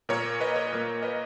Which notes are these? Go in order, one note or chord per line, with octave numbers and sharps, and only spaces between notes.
A#2 A#3 A#4 C#5
B4 D#5
A#4 C#5
A#2 A#3
B4 D#5